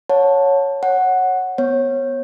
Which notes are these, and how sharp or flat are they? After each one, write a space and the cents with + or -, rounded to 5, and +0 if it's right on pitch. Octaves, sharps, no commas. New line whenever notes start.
C#5 +0 F#5 -35 A5 +0
C#5 -20 F#5 +0
B3 +0 C#5 -30